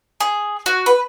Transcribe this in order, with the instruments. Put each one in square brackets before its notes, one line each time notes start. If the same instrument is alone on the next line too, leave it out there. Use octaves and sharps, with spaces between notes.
[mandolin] G#4
F#4
B4